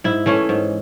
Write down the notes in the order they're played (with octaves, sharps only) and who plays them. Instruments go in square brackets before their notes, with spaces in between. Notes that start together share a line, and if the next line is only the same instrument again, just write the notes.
[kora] G#2 E4
E3 A3 C#4
G#2